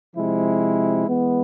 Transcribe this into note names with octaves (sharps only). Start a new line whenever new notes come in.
C3 F3 G#3 C4 E4
E3 G#3 B3